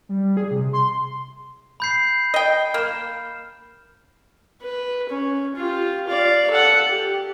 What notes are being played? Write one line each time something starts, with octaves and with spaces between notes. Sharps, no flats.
G3
G#4
C3
C6
B5 G6 C7
D#5 G5
A#3 F6 E7
B4
C#4
F4 G4
D5 F5
A4 F#5
G4